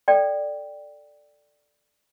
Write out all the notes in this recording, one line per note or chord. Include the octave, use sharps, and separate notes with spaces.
A4 D5 G5